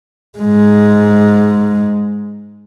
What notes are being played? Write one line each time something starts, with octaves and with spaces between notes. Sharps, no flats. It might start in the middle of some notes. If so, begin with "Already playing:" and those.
G#2 G#3